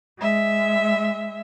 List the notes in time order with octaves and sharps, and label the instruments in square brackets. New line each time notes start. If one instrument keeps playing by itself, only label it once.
[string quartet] G#3 E5